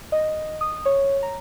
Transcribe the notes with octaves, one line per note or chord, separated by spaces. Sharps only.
D#5
D#6
C#5
A#5